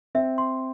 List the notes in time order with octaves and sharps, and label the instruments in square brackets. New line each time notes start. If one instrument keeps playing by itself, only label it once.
[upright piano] C4 [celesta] E5
[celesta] C6